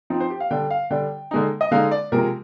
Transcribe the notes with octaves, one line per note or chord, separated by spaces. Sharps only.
F3 C4 D#4
C5
G4
F5
D3 G3 D4 G5
F5
D3 G3 D4 G5
D3 G#3 D#4
D#5
D3 G#3 D#4 F5
D5
C3 F3 G#3 A#4